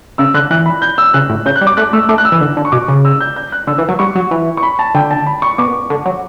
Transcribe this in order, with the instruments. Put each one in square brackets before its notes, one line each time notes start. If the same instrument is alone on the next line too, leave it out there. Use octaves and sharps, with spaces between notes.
[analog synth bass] C#3 [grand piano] E6
[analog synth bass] D3 [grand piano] F#6
[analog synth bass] E3 [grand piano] F#6
[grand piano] B5
G6
E6
[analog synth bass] C#3 [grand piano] F#6
[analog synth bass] A2
[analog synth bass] C#3 [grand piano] G6
[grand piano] F#6
[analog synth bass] G3
[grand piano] D6
[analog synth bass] A3 [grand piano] F#6
[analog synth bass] A3 [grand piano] E6
[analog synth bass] A3 [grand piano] D6
[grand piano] F#6
E6
[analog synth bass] E3
D3
D3
[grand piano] C#6
[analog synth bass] B2 [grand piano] D6
[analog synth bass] C#3
[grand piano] E6
G6
G6
F#6
[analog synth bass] D3 [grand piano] E6
[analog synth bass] E3
F#3
[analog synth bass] G3 [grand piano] C#6
[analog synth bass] F#3
E3
[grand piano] C#6
B5
A5
[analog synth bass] D3 [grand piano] G5
[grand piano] A5
B5
C#6
[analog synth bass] B2 [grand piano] D6
[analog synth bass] D3
F#3